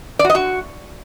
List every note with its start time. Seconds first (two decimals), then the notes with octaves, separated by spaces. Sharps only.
0.19 D5
0.25 F#4
0.30 D#5
0.35 F#4